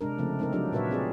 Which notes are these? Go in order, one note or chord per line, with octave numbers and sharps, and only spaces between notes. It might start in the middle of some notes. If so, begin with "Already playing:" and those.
C3 G#3 D4 A#4
C#3 F3 A3 C4
G#3 C4 D#4 A4 A#4
F3 F#3 D4 F4 G4
A#2 F#4 A#4 B4 C#5 E5
C4 G#4 D5